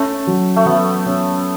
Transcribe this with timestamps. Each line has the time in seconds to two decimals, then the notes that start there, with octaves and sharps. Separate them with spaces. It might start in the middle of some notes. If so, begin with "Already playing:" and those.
Already playing: A3 C#4
0.27 F#3
0.56 A3
0.66 F#3 B3
1.06 C#4